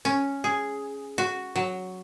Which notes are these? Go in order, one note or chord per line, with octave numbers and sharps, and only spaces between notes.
C#4
G#4
F#4
F#3